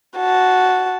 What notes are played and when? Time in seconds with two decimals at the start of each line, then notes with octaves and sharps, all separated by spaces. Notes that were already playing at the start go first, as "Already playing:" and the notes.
0.17 F#4 A5